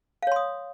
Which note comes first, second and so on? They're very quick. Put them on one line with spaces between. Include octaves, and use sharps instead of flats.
F5 C#5 C6 D#6